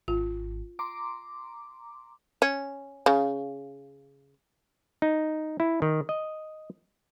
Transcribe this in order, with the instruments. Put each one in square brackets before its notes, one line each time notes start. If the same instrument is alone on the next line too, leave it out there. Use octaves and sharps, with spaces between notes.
[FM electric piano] G#1 [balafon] F4
[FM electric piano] A#5 C6 D6
[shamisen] C#4
C#3
[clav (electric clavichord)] D#4
E4
D#3
D#5